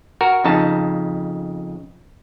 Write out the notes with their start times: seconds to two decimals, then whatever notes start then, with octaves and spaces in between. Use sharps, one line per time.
0.21 F#4 A#4
0.44 F2 C#3 D#4 A5